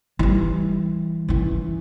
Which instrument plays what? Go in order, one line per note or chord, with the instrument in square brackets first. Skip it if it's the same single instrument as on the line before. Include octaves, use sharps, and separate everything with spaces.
[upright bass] E3 G3
E3 C#4